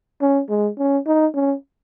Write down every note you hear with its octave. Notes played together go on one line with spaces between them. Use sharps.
C#4
G#3
C#4
D#4
C#4